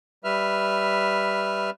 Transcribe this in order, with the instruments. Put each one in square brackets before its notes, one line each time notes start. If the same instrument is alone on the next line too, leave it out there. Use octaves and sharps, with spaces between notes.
[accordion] G3 B4 E5 F6